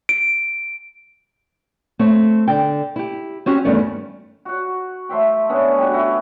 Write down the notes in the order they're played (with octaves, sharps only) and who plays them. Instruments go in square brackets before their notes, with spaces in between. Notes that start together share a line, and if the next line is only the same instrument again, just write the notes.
[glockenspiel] D7
[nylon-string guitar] A3 C4 C#5
D3 G5
E4 G4
C4 C#4 F#4 G4
E2 G2 D#3 A3 C#4 C#5
[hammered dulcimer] F#4 F#5
A3 C5 E5 G5
D3 B3 C#4
G3 F#4
E4 F#4